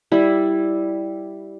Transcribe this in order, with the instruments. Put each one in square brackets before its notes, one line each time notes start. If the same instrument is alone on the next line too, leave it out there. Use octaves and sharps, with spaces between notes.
[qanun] G3 E4